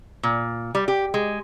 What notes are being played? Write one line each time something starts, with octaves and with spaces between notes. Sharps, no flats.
A#2
G3
G4
G#3